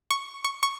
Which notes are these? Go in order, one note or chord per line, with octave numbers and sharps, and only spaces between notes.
C#6
C#6
C#6